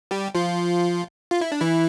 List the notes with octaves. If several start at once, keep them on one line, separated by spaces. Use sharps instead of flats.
G3 G4
F3 F4
F4
E4
D4
E3 E4